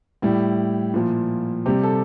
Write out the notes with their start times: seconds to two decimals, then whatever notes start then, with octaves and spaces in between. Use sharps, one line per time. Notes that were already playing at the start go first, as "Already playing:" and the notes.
0.22 A2 G3 E4
0.94 A#2 F3
1.66 C3 G3 G4
1.83 A4